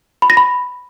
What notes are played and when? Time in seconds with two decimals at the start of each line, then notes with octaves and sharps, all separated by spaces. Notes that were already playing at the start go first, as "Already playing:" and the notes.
0.22 B5
0.30 A#6
0.37 B5